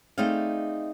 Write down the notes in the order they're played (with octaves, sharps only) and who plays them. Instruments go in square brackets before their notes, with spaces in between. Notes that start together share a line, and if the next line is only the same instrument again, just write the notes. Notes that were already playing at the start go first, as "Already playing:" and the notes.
[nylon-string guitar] A3 C4 D#4 G#4 D5 F5